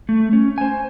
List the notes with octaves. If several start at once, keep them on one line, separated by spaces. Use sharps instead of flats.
A3
C#4
C5 G#5